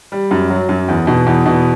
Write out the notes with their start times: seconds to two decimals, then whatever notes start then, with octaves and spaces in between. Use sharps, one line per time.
0.12 G3
0.31 F#2
0.50 F#3
0.69 F#2
0.88 E2
1.07 B2
1.26 E2
1.46 B2